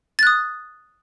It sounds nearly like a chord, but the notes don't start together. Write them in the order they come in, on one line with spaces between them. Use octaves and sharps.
A6 F#6 D#6